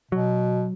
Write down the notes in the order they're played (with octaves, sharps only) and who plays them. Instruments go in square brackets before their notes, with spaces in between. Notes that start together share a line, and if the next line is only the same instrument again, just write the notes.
[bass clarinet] B2 [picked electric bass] F#3